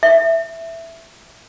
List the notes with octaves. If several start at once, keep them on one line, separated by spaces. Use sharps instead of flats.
E5